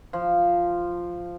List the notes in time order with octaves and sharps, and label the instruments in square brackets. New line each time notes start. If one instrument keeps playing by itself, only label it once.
[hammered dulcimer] F3